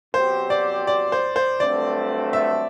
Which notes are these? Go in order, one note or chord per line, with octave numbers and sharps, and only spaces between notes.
B2 F#3 C4 G4 C5
D5
D5
C5
C5
G2 F#3 A3 C4 D5
E5